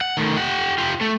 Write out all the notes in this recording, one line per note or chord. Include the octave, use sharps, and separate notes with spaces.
F#5
D#3 A3
G4 F#5
F4 G4
A3